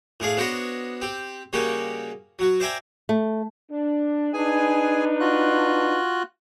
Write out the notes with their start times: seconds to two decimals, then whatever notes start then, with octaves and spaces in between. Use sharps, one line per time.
0.20 A2 D4 G#4 F5
0.37 B3 D4 F#4 C5 C#5 D#5
1.01 C4 G4
1.53 C#3 G3 A#3 C#4 F#4 G4
2.39 F#3 F#4
2.60 C5 D5 E5 G5 G#5 A#5
3.09 A3
3.71 D4
4.33 D4 D#4 G#4 B4 G#5
5.20 F4 F#4 F#6